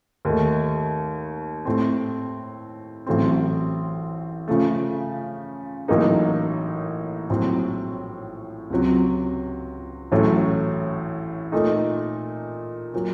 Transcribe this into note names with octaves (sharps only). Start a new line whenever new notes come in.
D#2 D#3 A3
A2 A3 C4
A1 A2 F#3 A3 C4
C#3 F3 A3
A1 A2 F#3 A#3 D#4
A#1 A2 F#3 C4
C#2 C3 F#3
A1 A2 F#3 A3 C#4
A#2 A3 D#4 A4
A#2 F#3